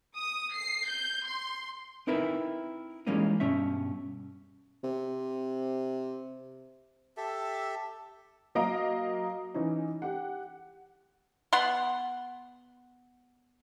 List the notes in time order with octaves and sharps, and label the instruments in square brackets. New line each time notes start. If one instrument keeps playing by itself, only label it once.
[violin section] D#6
C7
G6
C6
[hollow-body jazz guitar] C4 D#4 E4 A#4 B4 E5
E3 G3 G#3 A#3 C#4 D#4
G2 B2 C#4 E5
[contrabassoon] C3
[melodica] G4 A4 E5
[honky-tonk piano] F#3 A#3 D#5 F5 A#5 D7
E3 C#4 D#4
G4 F#5
[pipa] B3 F#5 C6